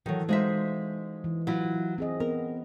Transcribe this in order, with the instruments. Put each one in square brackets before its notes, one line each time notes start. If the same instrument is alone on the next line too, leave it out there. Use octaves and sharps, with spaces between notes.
[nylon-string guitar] D#3 F#3 [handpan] E3 A4
[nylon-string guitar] G#3 D#4 E5 [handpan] F#4 C5 F5
[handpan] E3
[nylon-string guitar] F#3 E4 F4
[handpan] C4 G#4 D#5
[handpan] B3 [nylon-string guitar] A#4